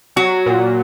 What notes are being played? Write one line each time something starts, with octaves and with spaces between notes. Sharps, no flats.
F#3 F#4
A#2